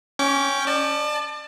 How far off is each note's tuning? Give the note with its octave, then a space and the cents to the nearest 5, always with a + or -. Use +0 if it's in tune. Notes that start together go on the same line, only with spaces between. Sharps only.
C#4 +0 G5 +0 D6 -35
D5 +35 A5 +0